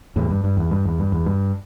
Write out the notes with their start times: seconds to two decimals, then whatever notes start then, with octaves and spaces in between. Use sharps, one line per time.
0.16 E2 A2
0.31 G2
0.44 G2
0.57 E2
0.71 G2
0.85 E2
0.99 G2
1.12 E2
1.26 G2